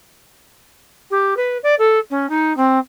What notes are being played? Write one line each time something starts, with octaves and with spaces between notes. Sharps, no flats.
G4
B4
D5
A4
C#4
D#4
C4